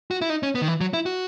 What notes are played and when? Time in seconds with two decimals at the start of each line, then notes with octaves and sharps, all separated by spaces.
0.11 F#4
0.22 E4
0.30 D#4
0.43 C#4
0.55 B3
0.62 D#3
0.68 E3
0.81 F#3
0.93 E4
1.06 F#4